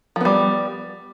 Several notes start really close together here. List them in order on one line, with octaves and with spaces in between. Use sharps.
F3 B3 G3